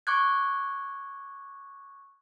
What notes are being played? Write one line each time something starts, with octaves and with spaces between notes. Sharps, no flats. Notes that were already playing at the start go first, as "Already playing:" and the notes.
C#6 D6 F#6 G#6